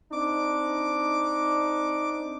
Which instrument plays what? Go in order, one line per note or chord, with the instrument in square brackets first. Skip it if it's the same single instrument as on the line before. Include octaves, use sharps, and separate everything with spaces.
[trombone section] C4 D4 D#4 [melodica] D6